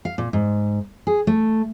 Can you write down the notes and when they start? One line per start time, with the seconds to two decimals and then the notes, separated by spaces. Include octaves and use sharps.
0.05 F5
0.18 A#2
0.33 G#2
1.07 G#4
1.27 A3